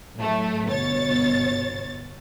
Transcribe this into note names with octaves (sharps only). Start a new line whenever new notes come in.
A2 F#3 A3
G1 B2 C#5 A6